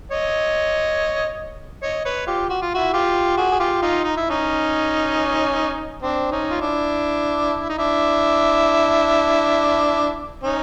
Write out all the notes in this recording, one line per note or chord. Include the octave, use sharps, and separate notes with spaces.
C#5 D#5
C#5 D#5
B4 C#5
F4 G4
F#4
F4
E4 F#4
F4 G4
F#4 G#4
G#4
F4 G4
D#4 F4
D#4
E4
C#4 D#4
C4 D4
C#4 D#4
F4
D4 E4
D#4
D4 E4
C#4 D#4